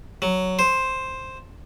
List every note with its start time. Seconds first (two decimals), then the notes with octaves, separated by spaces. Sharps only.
0.22 F#3
0.59 C5